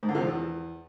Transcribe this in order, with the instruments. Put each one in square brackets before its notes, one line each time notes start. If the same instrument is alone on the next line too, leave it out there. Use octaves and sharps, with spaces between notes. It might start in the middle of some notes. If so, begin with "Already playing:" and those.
[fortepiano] G#2
D3
C3
F3
E2